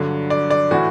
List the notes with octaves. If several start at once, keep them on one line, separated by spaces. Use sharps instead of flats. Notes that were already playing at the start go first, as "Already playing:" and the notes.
Already playing: G2 D3 F#3
D5
D5
A2 E3 F#4